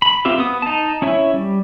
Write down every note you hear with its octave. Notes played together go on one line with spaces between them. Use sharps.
B5
B3 C4 F4 G4 E5
B3 D#6
D#4 A5
C#4 E4 C#5 E5
G3